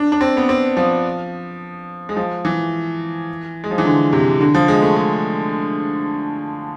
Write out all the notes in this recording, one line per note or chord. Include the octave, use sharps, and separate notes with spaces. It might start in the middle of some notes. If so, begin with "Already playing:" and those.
Already playing: D4
D4
C4
B3
C4
F3
G#3
F3
E3
G#3
F3
E3
D3
C3
D3
F3
G#3
A3
G#3